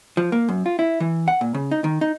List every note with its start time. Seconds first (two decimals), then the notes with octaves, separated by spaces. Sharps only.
0.17 F3
0.32 A#3
0.49 F#2
0.66 F4
0.79 E4
1.00 E3
1.28 F#5
1.41 A#2
1.54 C#3
1.71 D#4
1.84 D#3
2.01 D#4